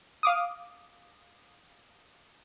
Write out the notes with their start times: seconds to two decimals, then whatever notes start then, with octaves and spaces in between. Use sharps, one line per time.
0.23 F5 D6 D#6